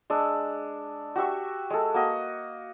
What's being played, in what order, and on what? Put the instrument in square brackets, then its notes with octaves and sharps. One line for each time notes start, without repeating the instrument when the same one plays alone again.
[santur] G#3 D4 E6
F#4 G4 E5 C#6
G#3 A4
A#3 F#4 D#5